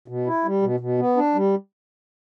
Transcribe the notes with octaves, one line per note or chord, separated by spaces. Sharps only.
B2
E4
G3
B2
B2
B3
D4
G3